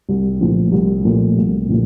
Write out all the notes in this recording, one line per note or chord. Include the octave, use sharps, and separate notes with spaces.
C2
A#2 F3 A3
C2
A#2 F3 A3
C2
A#2 F3 A3